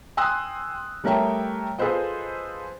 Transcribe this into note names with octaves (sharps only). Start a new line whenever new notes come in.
G5 G#5 C6 D#6 E6 F#6
G3 A3 A#4 C#5 E5 G5
F4 G#4 A4 B4 C5 D#5